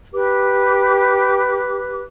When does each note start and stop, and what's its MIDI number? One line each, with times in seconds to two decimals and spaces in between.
0.13 2.01 67
0.13 2.01 71
0.13 2.01 86